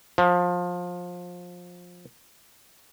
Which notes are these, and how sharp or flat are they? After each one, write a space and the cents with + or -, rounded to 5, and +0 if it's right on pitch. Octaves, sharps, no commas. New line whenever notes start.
F3 +20